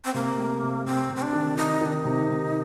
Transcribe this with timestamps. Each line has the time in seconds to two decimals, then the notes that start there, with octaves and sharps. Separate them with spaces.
0.05 C4
0.14 C3 A#3
0.38 A3
0.63 C3
0.85 C3 C4
1.10 C3
1.16 C4
1.22 D4
1.33 D#3
1.57 D#3 D#4
1.81 D#3 D4
1.92 D#4
2.05 C3
2.29 C3